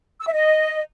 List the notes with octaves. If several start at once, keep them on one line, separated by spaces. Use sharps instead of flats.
E6
E5
D#5